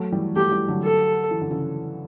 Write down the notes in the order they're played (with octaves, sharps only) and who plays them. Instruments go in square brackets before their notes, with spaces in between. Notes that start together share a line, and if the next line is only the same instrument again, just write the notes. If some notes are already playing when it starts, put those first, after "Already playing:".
Already playing: [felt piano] F#3 A3
E3 G3
[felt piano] F#3 A3 [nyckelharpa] G4
[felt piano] E3 G3
D3 F#3
[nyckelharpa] A4
[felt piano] E3
D3
C#3 E3